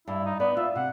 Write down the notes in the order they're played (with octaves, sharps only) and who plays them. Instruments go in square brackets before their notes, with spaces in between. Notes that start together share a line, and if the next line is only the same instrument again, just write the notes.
[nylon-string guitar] G2 [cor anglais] E4
[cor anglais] D#4
[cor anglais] B3 [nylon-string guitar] D5
[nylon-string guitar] F4 [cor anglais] E5
[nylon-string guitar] C3 [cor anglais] F#5